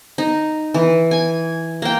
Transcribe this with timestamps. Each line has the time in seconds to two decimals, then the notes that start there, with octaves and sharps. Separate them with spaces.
0.18 D#4
0.74 E3
1.11 G#5
1.82 A#3 G5